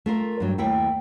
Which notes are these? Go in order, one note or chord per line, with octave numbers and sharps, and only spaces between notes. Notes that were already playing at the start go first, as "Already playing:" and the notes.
A3 F4 A#4
G2 F#3
D#2 A3 E4 G5